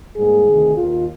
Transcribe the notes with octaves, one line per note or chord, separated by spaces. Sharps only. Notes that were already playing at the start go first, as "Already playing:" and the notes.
G#2 G3 A#3 G#4
D2 C3 D#3
D#2 D#3 A#3 F4